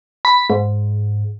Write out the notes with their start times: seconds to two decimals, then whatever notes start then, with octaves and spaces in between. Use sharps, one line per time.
0.25 B5
0.50 G#2